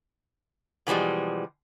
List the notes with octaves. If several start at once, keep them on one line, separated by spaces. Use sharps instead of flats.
B2 E3 F3 G3 G#3